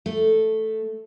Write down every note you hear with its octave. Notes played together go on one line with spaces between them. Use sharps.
A3